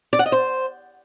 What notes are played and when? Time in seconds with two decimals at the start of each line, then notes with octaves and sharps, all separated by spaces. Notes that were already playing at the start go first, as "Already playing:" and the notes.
0.13 D5
0.19 F#5
0.26 D#5
0.32 C5